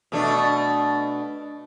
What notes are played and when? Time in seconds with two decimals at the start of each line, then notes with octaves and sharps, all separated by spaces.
0.12 B2 A3 D4